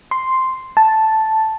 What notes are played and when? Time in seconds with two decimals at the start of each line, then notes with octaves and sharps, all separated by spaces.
0.11 C6
0.77 A5